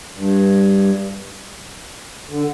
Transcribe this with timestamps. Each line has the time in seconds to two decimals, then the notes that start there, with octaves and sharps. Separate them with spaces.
0.16 G2
2.29 D3